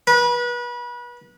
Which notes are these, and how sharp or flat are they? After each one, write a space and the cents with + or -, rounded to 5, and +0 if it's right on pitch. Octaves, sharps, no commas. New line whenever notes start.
B4 -30